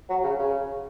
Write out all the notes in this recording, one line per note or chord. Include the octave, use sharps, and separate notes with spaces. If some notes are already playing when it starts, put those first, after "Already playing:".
F#3
C#3
C#3